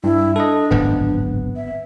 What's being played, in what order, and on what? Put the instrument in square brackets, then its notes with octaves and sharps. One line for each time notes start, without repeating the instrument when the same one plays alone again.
[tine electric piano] G2 [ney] E4
[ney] D4 [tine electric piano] A4 D#5
[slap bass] D1 G#1 F#2 [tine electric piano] B3
[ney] E5